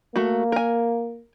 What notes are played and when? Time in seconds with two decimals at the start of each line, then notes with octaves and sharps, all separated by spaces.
0.16 A3 A#3 F#4
0.52 A#4 G#5